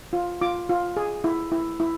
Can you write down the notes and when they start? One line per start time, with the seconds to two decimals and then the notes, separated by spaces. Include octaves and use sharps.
0.13 F4
0.41 F4 D6
0.69 F4
0.97 G#4
1.24 E4
1.52 E4
1.80 E4